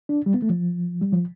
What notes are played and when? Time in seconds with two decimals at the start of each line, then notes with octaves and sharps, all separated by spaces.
0.09 D4
0.26 G3
0.34 B3
0.42 A3
0.50 F3
1.02 G3
1.13 F3